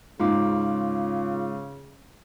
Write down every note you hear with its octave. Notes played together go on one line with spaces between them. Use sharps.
G#2 C#3 F4 F5 D6